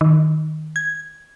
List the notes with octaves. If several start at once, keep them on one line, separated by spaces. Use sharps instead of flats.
D#3
G#6